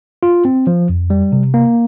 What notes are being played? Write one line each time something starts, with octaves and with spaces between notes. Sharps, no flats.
F4
C4
F3
F2
G3
C3
A#3